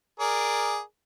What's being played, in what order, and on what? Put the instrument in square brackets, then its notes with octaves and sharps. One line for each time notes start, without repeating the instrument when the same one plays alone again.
[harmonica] G#4 A#4 D5